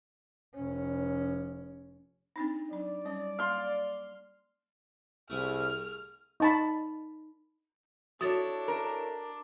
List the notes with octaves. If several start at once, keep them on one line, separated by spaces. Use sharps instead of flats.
F1 C#4
C4 D4 D#4
F#3 D4 D5
G3 C#4 C#5
A#3 F5 C6
C2 A3 E4 G#4 F6
D#4 A5 B5
D4 E4 F#4 A4 C#5 A6
A#4